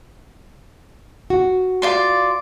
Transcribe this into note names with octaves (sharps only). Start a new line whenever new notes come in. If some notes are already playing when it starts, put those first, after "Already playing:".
F#4
F4 D5 C6